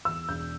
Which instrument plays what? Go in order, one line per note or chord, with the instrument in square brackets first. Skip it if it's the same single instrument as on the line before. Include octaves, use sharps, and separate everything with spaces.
[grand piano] E2 [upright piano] E6
[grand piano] E1 [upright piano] G6